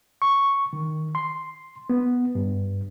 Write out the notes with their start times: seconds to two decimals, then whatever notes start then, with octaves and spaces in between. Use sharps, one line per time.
0.22 C#6
0.73 D#3
1.15 C6
1.90 B3
2.35 G2